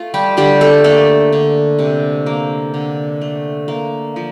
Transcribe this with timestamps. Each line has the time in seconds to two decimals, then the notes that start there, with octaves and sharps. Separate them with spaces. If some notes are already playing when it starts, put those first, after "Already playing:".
Already playing: A3 F4
0.14 G3 G4
0.37 D3 G3 G4
0.61 A3 A4
0.84 A3 A#3 A4
1.33 D3
1.79 C3
2.26 A#3
2.74 D3
3.21 A3
3.68 A#3
4.16 F3